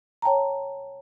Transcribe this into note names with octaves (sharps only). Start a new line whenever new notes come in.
C#5 G5 A5 A#5